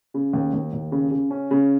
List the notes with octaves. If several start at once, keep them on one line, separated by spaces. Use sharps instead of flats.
C#3
D#2
D#2
D#2
C#3
C#3
C#4
C#3